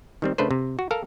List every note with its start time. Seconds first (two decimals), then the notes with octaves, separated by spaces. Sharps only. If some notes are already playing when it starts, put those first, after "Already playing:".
0.22 D#3 G3 C4
0.38 C#3 A3 D4 B4 C5
0.51 C3
0.79 F#4
0.91 A4 A#4 F5 A#5